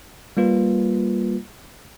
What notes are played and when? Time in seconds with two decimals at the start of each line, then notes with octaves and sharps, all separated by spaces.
0.37 G3 A#3 F4 B4